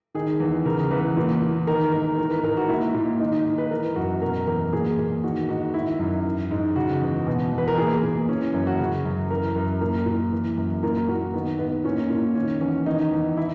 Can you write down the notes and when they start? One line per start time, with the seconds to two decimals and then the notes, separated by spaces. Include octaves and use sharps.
0.15 D#3 G#4
0.40 E2
0.65 C#3 A#4
0.91 E2 B4
1.17 A#2
1.42 A#2
1.67 D#3 A#4
1.92 G#2 A#4
2.18 E3 A#4
2.31 B4
2.43 G#2 A#4
2.57 F#4
2.69 A#2 E4
2.94 A#2
3.20 D#3 D#4
3.32 D#4
3.45 G#2
3.58 B4
3.71 E3 A#4
3.96 F#2 F#4
4.22 B2 A#4
4.47 E2 A#4
4.73 A#2 G#4
4.99 A#2
5.24 D#3 F#4
5.49 G#2 F#4
5.74 D#3 E4
5.99 F#2
6.25 E3
6.51 G#2
6.76 C#3 F#4
7.01 E2
7.27 B2
7.53 E2
7.58 B4
7.68 A#4
7.78 A#2 G#4
8.03 A#2
8.29 E3 C#4
8.54 F#2 C#4
8.67 F#4
8.79 C#3
9.05 F#2
9.30 E3 A#4
9.56 F#2
9.81 A#2 A#4
10.06 A#2
10.32 E3
10.58 F#2
10.83 A#2 A#4
11.09 A#2 F#4
11.34 D#3 B3
11.59 G#2 B3
11.84 A#2 C#4
12.10 A#2
12.35 D#3 C#4
12.61 E2 C#4
12.86 D#3 D#4
13.12 E2
13.37 E3 E4